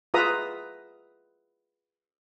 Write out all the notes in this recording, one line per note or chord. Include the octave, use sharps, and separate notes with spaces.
F4 G#4 B4 E5 A#5 D#6